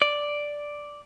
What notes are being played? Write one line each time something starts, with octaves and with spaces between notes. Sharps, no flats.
D5